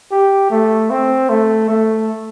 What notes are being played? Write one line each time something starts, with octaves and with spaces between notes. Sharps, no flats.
G4
A3
C4
A3
A3